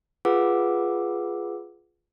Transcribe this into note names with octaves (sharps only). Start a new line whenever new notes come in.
F4 G#4 B4 F#5 D6 E6